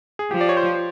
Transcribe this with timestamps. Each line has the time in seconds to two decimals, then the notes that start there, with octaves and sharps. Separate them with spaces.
0.19 G#4
0.31 F3 G4
0.41 D5
0.49 C#5
0.57 C5